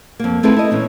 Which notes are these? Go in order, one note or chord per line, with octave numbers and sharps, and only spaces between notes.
F2 A#3
A3 C4 E4 A4 B4
E4 D#5
A#2 E3 C#4